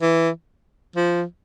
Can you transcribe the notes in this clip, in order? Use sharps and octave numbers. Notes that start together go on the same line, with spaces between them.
E3
F3